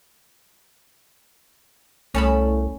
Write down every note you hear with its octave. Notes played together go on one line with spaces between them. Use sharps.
C2 A3 C#4 A5 B5